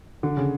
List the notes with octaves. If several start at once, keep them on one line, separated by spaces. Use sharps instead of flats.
D3
C#3